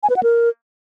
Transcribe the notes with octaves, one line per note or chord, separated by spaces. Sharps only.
G#5
B4
F#5
A#4